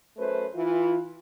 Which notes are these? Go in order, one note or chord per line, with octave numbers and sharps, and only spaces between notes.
F#2 A3 B4 C5
E3 F4